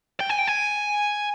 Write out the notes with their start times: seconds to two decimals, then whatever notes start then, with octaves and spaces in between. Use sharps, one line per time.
0.20 G5
0.29 G#5
0.38 G5
0.47 G#5